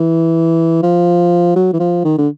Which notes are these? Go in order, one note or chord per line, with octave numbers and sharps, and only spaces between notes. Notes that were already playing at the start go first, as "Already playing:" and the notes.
Already playing: E3
F3
F#3
E3
F3
D#3
D3